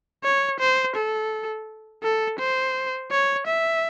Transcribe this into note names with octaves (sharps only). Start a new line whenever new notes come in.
C#5
C5
A4
A4
C5
C#5
E5